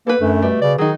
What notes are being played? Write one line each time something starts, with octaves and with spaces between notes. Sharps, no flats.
A#3 B3 A4 B4
F#2 D3 A3
B2 G3
C#3 D5
D#3 F#3 D#4 G#4